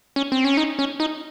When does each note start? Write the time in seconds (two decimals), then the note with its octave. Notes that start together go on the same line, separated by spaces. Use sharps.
0.16 C#4
0.32 C4
0.44 C#4
0.57 D#4
0.79 C#4
1.00 D#4